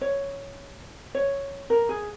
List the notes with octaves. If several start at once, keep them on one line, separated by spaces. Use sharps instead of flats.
C#5
C#5
A#4
G#4